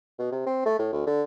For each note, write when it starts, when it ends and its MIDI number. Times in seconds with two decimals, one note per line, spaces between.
0.19 0.30 47
0.32 0.45 48
0.46 0.66 60
0.66 0.77 57
0.79 0.89 45
0.93 1.06 38
1.07 1.23 50